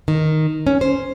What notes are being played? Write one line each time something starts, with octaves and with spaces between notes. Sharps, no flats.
D#3
C#4
C5